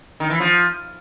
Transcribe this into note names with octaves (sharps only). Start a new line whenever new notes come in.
D#3
E3
F3